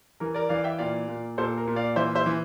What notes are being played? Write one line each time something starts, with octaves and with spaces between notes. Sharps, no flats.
E3 A#4
A#4 D5
E3 D5 F5
E5 G5
A#2 D5 F5
A#2
A#2 A4 C5
A#4
A#2
D5 F5
E3 C5 E5
C5 E5
E3